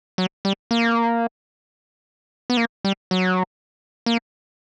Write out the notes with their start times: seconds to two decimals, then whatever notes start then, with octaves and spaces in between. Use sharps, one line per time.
0.18 F#3
0.45 G3
0.71 A#3
2.50 B3
2.57 A#3
2.85 G3
3.11 F#3
4.06 A#3